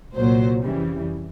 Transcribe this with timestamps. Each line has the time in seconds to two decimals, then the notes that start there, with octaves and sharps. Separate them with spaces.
0.14 C2 A#2 F#3 C5
0.62 F2 C#3 E3 G3